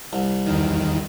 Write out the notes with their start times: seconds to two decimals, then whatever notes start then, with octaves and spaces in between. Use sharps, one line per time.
0.13 C2
0.46 E2 D#3